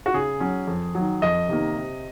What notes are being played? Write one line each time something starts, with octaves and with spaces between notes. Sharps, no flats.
F#4
C#3 G#4
F#3 C#4
F2
D#3 F#3
F2 D#5
C3 D#3 A#3
C3